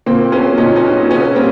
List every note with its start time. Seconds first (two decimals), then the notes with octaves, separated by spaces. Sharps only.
0.06 A#2 A#3 C4
0.32 F#3 B3 C#4
0.58 A#2 C#4 D#4
0.75 C#4 D#4
0.84 F#3
1.10 B2 B3 C#4
1.36 G3 A#3 C4